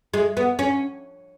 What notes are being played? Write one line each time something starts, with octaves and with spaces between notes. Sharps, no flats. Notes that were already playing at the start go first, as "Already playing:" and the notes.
G#3
B3
C#4